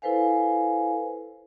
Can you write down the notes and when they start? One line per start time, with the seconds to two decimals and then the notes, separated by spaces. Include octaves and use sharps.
0.02 E4 A4 B4 C5 F5 G#5